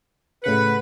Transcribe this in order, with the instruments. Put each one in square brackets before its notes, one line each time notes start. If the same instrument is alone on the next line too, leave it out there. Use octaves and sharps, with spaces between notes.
[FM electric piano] A2 C#3 F#5 [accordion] B4